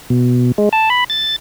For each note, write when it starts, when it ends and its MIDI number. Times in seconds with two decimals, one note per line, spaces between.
0.10 0.52 47
0.58 0.69 56
0.73 0.89 81
0.90 1.04 83
1.10 1.36 93